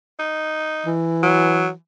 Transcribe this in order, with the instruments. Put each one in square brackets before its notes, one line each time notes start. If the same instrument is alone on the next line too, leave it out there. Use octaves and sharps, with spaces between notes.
[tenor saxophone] D#4
[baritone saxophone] E3
[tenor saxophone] F#3